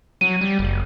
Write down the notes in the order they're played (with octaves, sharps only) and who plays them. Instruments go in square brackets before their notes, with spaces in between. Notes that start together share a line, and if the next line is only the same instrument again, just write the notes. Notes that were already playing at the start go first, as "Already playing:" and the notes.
[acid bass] F#3 [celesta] D#7
[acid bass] G3
F#1